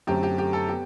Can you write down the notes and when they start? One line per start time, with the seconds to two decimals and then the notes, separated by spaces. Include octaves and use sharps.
0.07 F#2 D3 A3 C4 G4
0.23 G4
0.38 G4
0.53 A4
0.69 B3 G4